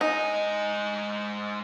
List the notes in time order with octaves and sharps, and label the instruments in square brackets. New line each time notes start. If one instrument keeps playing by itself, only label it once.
[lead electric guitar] G#2 G#5 [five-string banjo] D#4